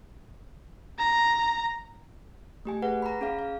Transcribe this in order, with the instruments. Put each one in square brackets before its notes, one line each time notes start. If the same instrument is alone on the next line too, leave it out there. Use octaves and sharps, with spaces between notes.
[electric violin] A#5
[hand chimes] A3 G4 G#5
G#4 B4 F#5
A#5 B5
C#4 G#4 F5
F5